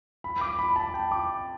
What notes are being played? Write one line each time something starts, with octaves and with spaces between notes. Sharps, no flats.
B5
D6
B5
A5
G5
D6